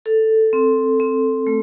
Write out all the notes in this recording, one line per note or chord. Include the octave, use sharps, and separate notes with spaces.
A4
C4
C4
A3